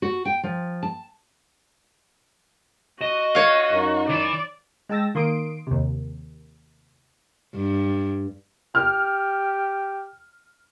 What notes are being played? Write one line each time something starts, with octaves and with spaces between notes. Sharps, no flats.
F#4
G5
F3
A5
F#4 D#5
C#5 F5
F#2 D#4
E3 D5 B5
G#3 G5 A5 E6 A6 A#6
D#3 A#3 C6 D#6 D7
D#2 C3
G2
G4 F6